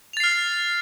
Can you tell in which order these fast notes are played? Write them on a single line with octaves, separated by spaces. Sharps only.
F7 A6 C7 F6